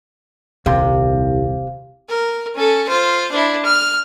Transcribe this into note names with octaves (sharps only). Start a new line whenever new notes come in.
D#1 C2 C3 F5
A#4
C#4 A4
F4 C5
D4 E4
F6